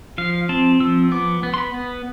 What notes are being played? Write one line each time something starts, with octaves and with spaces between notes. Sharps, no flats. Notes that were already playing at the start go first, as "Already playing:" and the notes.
F3 F5
C4 A5
F3 E6
B3 D6
B3
C6
B5
B3